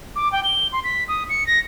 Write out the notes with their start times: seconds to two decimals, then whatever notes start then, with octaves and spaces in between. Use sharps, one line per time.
0.16 D6
0.32 G5
0.44 G7
0.73 C6
0.84 B6
1.08 D#6
1.29 C#7
1.47 A#6